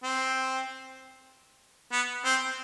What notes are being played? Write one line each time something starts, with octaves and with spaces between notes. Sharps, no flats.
C4
B3
C4